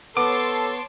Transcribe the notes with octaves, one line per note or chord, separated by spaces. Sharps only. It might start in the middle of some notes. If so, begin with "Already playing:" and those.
B3 A4 C#5 A5 C6 D6